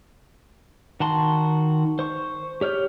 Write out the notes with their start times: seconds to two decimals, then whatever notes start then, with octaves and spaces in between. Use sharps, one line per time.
1.00 D#3 F#4 A5 C6
1.99 C5 C#6
2.61 G4 C#5 F6 G6